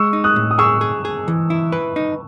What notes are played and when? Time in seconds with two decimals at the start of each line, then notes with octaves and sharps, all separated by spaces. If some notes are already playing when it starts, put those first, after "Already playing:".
Already playing: G#3 C#6 E6
0.13 D#4
0.24 D#6 F#6
0.36 A2
0.51 D#6
0.58 G#4 C#6 E6
0.81 G#4
1.05 G#4
1.28 E3
1.50 E4
1.72 B4
1.96 D#4